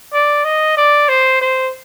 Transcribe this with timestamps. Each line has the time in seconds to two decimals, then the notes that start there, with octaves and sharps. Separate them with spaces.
0.13 D5
0.44 D#5
0.77 D5
1.09 C5
1.41 C5